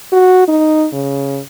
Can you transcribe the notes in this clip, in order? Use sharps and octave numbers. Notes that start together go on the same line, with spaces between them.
F#4
D#4
C#3